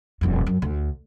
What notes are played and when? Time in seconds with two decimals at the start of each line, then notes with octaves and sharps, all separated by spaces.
0.21 D#1 F2
0.46 F#2
0.62 D2